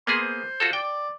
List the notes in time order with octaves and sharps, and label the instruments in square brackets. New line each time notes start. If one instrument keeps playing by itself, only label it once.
[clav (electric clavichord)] A#3 B3 G#4 [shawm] C6
[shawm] C5
[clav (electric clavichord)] F4 F#4 A4
[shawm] D5 [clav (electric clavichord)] G5